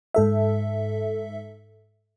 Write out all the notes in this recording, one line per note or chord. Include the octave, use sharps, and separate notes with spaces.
G#2 A4 E5